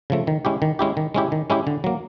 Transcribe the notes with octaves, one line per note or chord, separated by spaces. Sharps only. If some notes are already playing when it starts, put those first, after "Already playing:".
C#3 F3 A3
D#3
G#3 C#4 E4 G4
D#3
G#3 C#4 E4 G4
D#3
G#3 C#4 E4 G4
D#3
G#3 C#4 E4 G4
D3
F#3 A#3